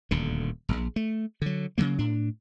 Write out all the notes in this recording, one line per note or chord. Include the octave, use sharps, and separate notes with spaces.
D#1 D2 D3
D#1 A#1
A3
D3 F#3
C#3 F3 F#3 A#3
A2 D4